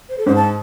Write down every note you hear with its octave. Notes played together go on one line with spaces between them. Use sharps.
C5
A4
G#2 C5
A5